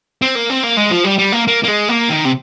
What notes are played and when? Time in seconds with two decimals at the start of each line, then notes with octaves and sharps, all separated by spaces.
0.22 C4
0.35 A#3
0.50 C4
0.64 A#3
0.77 G#3
0.91 F3
1.05 G3
1.19 G3
1.33 A#3
1.47 A#3
1.63 A#3
1.68 G#3
1.88 A#3
2.09 D#3
2.25 C3